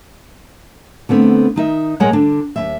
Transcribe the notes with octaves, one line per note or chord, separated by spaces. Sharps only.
D3 A3 B3 C4
D#3 D#4 E5
A#2 G#3 A#4 C#5 F#5 A#5
D3 D4
D#2 G#3 E5